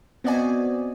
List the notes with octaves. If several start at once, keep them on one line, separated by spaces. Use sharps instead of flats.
B3 C4 F#4 D5 D#5 G#5